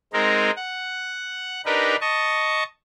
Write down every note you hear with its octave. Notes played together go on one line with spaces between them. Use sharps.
G#3 C4 D#4 A#4
F#5
D4 D#4 G4 A#4 B4
D#5 A5 C#6